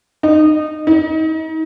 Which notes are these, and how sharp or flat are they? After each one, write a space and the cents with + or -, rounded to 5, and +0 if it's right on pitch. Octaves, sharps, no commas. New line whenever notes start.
D#4 -20
D#4 +35